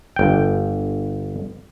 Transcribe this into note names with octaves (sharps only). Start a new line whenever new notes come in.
G1 G5